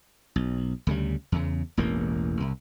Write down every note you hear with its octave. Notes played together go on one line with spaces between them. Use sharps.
B1
D2 C#3 G3
E2 C#3
E1 A1 E2 A#3
C2